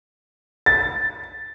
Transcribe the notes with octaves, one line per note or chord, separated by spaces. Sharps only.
A6